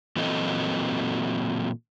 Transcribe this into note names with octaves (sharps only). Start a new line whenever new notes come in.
A#2 E3 F#3 C4 A4 D#5